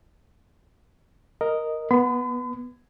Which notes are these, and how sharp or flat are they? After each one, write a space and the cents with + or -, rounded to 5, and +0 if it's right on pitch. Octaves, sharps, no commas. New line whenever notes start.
A#4 +0 D#5 +0
B3 -10 B5 +45